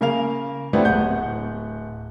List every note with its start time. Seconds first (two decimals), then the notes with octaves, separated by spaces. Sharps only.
0.01 C#3 A#3 A#4 F5 F7
0.73 A3 B3 C4 D4 E4 G4
0.85 D1 F#5 G6